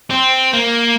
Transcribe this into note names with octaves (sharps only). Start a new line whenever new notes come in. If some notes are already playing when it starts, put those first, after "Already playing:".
C4
A#3